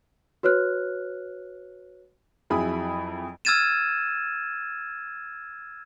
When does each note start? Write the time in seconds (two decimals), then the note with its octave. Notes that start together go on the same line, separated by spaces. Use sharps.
0.43 F#4 B4 C#5 F6 F#6
2.50 F2 F#3 E4 G#4 B5 D#6
3.45 E6 F6 G#6 A6 D#7 E7